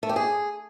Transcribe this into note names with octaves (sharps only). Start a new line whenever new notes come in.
A3
G4
G#4